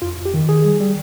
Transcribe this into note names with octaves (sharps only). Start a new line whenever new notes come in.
F2 F4
F2
G4
D#3
D#3 G#4
G3
G3